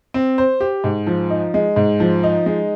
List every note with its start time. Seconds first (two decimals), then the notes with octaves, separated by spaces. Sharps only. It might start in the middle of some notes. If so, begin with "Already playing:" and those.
0.14 C4
0.38 C5
0.61 G4
0.84 G#2
1.07 F3
1.30 D#4
1.54 G#3
1.76 G#2
2.00 F3
2.23 D#4
2.46 G#3